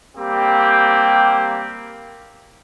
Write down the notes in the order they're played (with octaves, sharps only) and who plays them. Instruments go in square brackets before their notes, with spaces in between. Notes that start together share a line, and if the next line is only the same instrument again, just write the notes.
[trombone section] G3 A#3 C4 G4